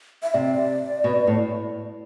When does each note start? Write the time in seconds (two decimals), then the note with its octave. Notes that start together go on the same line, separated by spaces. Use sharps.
0.23 E5
0.34 C3 D5
1.04 B2
1.27 A2